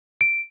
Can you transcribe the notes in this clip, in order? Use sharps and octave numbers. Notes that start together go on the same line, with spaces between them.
D7